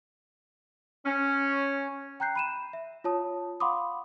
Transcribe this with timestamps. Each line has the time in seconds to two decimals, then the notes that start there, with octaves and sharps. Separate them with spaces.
1.05 C#4
2.20 G5 A#5 F#6 G6 C7
2.36 B5 D#7 E7
2.73 E5
3.04 F4 C#5 A5 D#6
3.60 F5 F#5 B5 C6 D6 D#6